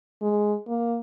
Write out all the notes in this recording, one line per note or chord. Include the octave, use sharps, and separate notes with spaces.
G#3
A#3